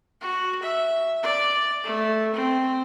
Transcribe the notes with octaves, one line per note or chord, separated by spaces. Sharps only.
F#4
E5
D5
A3
C4